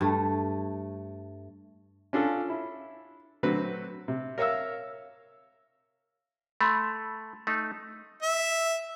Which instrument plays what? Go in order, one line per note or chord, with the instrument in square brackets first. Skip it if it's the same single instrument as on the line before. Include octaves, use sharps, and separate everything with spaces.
[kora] G2 A3
[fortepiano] C#4 D4 F4 A4
E4
D3 F#3 A3 C4 B4
C3
A#4 C#5 E5 F5 E6
[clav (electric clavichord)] A3 [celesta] B5 C6 G#6
[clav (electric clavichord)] A3 D#4
[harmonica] E5